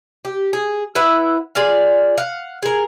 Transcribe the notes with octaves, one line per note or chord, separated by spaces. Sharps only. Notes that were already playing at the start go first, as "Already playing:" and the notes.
G4
G#4
E4 B4 E5 F#5
F4 G#4 D5 F5
F5 F#5
G#4 A#4